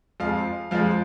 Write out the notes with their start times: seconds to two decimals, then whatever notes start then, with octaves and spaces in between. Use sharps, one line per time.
0.20 F2 F3 G#3 F5
0.71 F2 F3 G#3 F5